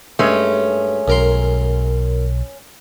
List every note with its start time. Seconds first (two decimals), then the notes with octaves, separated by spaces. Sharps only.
0.19 G2 G#3 A3 C#4
1.08 B1 F#2 A#4 C6